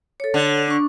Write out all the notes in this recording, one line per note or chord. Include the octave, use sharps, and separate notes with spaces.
A4 C#5
D3
D4 C#6